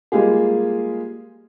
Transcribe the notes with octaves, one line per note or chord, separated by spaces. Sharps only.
G3 G#3 A#3 F4 G4 G#4